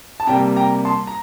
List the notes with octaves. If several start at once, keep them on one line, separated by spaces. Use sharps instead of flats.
A5
C3 G3 A#3 G5 A#5
G5 A#5
A5 C6
A#5